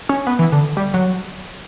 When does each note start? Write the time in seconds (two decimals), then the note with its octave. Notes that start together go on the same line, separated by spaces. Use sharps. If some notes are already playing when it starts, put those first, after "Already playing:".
0.09 C#4
0.27 B3
0.39 E3
0.52 D3
0.77 G3
0.94 F#3